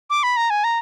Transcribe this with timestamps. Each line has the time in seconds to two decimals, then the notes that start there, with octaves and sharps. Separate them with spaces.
0.10 D6
0.23 B5
0.37 A#5
0.50 G#5
0.64 A#5